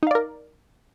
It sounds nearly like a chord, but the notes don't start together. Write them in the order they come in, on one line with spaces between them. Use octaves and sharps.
D#4 F5 D5 A#4